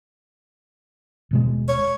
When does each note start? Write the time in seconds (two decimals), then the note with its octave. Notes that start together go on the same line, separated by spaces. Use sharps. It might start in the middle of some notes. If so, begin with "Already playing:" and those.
1.31 D#1 B2 G#3
1.68 C#5